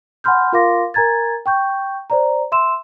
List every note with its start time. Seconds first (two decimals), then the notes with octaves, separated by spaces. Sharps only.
0.24 F#5 G#5 B5 C6 F6 G6
0.53 F4 A#4 F5 C6 D6 A#6
0.94 A#4 G#5 A#5 G#6 A6
1.46 G5 C#6 G6
2.10 C5 D5 A#5
2.52 E5 C6 E6 E7